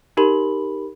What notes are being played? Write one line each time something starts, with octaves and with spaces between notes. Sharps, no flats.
D#4 G4 A#4 B5 F#7